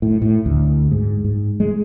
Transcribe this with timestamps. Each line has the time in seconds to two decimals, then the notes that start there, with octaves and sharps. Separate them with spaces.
0.02 A2
0.22 A2
0.46 D2
0.91 G#2
1.25 G#2
1.60 G#3